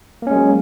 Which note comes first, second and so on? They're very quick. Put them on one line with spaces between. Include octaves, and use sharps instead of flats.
A#3 C#4 G#3 F#3